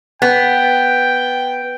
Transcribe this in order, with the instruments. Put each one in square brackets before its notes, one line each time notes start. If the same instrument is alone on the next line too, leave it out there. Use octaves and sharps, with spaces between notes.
[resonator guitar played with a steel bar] B3 [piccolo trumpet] G5